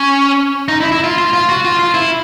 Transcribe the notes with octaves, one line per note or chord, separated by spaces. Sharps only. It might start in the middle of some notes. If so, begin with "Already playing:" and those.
Already playing: C#4
D#4
E4
E4
F4
F4
F4
F#4
F4
F4
E4